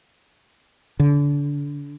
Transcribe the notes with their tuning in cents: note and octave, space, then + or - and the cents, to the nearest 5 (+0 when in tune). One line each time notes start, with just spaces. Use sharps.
D3 -30